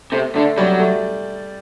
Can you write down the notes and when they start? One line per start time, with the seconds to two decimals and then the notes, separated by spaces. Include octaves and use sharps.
0.12 C3 A3
0.35 D3 A3
0.57 F#3 G3
0.80 A3